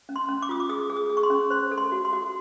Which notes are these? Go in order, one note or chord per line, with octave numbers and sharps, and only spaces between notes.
C#4
C6
C#4
D6
F4 D#6
D6
G#4 D#6
G#4
D#6
G#4
C#6
C6
C#4
C5 C6
A4
C6
F#4
C6
F#4